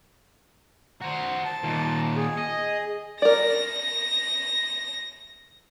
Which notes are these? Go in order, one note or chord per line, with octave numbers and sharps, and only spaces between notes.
F#4 C5 A#5
A5
D#2 A#2
G#4
D#5
A#4 D5 A#6